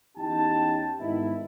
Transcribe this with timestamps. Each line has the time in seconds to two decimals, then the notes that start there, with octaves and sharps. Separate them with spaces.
0.17 E2 C#4 D#4 G4 G5 A5
0.99 G#2 D#3 B3 D#4 E4